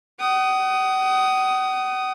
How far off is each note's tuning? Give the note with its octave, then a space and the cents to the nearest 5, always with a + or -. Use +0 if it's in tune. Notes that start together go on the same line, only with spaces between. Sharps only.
F#5 +40 D#6 +0